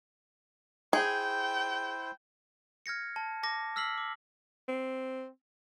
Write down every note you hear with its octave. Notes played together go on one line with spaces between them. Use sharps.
E4 G#4 C5 G5
F6 G#6 A#6 C#7
A5
A5 D6 A#6
E6 F6 B6 C7 F#7
D6
C4